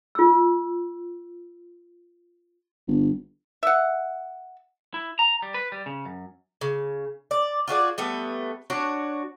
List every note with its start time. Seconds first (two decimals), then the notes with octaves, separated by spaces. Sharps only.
0.15 F4 E6
2.88 G1
3.63 E5 F#5
4.94 E4
5.19 A#5
5.42 G3
5.54 B4
5.72 G3
5.86 C#3
6.05 F#2
6.61 C#3
7.31 D5
7.68 F4 F#4 G#4 D5
7.98 G3 A3 B3
8.70 D4 F#4 C#5